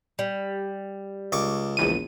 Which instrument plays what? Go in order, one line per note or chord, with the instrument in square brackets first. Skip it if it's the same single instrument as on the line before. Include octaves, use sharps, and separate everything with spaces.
[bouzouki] G3
[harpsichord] C#2 C#6 D6
[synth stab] A#1 E2 D#7